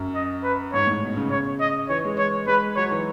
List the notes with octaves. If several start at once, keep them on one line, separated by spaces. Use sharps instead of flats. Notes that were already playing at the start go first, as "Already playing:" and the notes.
Already playing: F#2
D#5
B4
G#2 C#5
A2
B2
C#3
C#5
D#5
E3 C#5
G#3
C#5
G#3 B4
F#3 C#5
E3